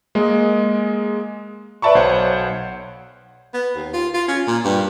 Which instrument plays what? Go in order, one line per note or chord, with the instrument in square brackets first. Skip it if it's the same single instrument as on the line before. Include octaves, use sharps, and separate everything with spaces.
[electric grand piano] G#3 A#3 D#5
B4 D5 E5 A5 B5 C#6
B1 C5 C#5 F#5
[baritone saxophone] B3
D#2
F4
F4
C#4
A#2
G2